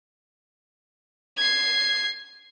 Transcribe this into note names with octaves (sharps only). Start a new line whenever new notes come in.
G#6 C7